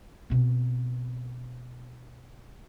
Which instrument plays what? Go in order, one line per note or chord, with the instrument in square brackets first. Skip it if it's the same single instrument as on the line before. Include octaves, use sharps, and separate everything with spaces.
[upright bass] B2 C4